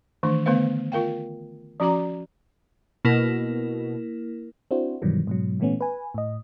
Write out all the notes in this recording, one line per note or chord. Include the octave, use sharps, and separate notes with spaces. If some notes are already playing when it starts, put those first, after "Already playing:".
D#3 E3 A3 D4
D3 A3 B3 B4 C5 F5
F4 A#4 F5 G5
F3 C#4 F#4 D5 A#5 D6
B2 A#3 E4 A#4
C4 D4 E4 F#4 C5
G2 B2 D#3 E3 F#3 G3
G#2 B2 F#3
A#2 E3 A3 B3 C#4
B4 G#5
A2 D#5